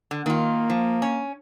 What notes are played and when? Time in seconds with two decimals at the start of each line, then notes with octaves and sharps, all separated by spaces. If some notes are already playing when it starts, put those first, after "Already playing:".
0.11 D3
0.26 D#3 A#3 F4
0.70 F3
1.02 C#4